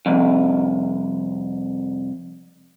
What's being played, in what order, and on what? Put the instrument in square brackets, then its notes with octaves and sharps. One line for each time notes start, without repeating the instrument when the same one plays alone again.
[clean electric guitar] C2 F2